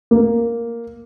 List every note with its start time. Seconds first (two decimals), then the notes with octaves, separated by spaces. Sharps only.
0.11 A#3